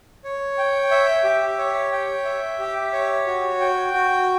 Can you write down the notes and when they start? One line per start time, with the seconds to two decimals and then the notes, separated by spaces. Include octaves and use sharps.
0.24 C#5
0.58 G5
0.91 E5
1.24 G4
1.58 C#5
1.92 G5
2.25 E5
2.59 G4
2.93 C#5
3.27 F#4
3.60 G5
3.93 F#4